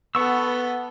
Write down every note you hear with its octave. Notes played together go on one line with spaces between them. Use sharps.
B3 A4 F#5 C#6 E6